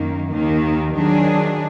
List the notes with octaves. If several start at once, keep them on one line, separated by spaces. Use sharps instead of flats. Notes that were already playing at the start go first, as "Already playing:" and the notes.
Already playing: F#2 D#3 A#3
D#2 D#3 A#3
D#3 F#3 D4 G#4